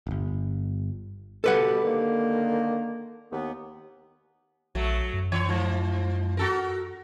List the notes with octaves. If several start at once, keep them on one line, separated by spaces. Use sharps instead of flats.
D1 G1
B2 G4 A4 B4 F#5
D3 D#3 A#3
D#2 B3
A#1 F#3 A3
F#2
E3 C#5
G#2 F3
F#4 A4 A#4